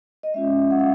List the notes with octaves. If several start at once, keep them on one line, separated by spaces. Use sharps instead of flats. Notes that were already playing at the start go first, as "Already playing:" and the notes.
D#5
G#3 C#4 F4 E5
F#5
F5